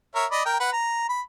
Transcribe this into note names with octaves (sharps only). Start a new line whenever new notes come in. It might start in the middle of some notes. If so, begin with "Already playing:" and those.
A#4 C#5 E5
D5 D#5 B5
A#4 G5
B4 F#5
A#5
B5